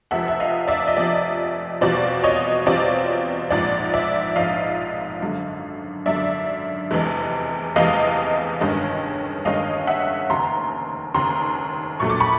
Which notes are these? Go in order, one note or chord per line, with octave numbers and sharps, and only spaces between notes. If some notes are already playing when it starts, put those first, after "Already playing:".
F1 F2 C3 F3 E5 F#5
E5
D#5 F5
D5 E5
D#5
F1 F2 C3 F3 D5
E2 B2 G3 C4 F4 D5
C#5 D#5
E2 B2 G3 C4 F4 D5
A#1 G#2 F3 D5
D5 E5
A#1 G#2 F3 D#5 F5
G#1 F#2 D3
G#1 F#2 D3 D5 E5
F1 E2 C3 E3 G#3
F1 E2 C3 E3 G#3 D#5 F5
G1 G2 D#3 G#3 C#4
G1 G2 D#3 G#3 C#4 D#5 F5
E5 F#5
F1 D#2 C#3 A#5 C6
F1 D#2 C#3 A#5 C6
A#1 A#2 F#3 A3 C#6
D6
B5 C#6